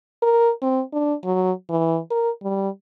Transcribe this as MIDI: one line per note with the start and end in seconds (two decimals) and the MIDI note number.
0.22 0.51 70
0.62 0.82 60
0.93 1.14 62
1.24 1.52 54
1.70 1.99 52
2.11 2.30 70
2.43 2.69 55